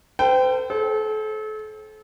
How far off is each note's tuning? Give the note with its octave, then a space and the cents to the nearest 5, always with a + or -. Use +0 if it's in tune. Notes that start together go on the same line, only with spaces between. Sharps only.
A4 +30 C5 -40 G5 +0
A4 -35 C5 +25